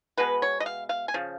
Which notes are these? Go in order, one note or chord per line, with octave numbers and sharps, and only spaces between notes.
B2 G#3 B3 B4
C#5
D#5
F5
F5
G#5
C#3 F3